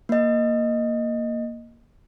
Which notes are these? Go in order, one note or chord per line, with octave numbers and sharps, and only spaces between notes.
A#3 D#5